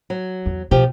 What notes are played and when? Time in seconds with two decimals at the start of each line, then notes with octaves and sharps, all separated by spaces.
0.10 F#3
0.46 E2
0.71 B2 F3 G4